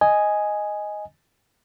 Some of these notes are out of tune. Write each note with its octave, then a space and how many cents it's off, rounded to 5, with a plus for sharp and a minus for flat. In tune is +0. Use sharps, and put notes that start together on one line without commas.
D#5 +0 G#5 +0